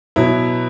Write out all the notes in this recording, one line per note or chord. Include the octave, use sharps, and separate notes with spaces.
B2 F#3 E4